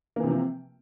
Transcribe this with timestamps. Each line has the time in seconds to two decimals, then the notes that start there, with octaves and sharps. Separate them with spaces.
0.16 A#3
0.20 E3
0.24 C3
0.27 F3
0.31 C4